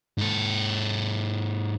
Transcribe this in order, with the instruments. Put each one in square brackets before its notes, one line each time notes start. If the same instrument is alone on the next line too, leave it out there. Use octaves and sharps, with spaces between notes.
[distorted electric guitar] G#2 A4